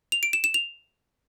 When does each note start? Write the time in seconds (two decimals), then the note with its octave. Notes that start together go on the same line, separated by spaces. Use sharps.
0.12 F7
0.23 D7
0.33 E7
0.44 E7
0.54 F7